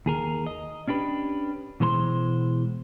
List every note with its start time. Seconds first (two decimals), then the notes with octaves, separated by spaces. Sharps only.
0.06 D#2 G#4 A#4
0.46 D#5
0.88 C#4 D4 G4 B4
1.80 B2 E3 G#3 C5 A#5 C6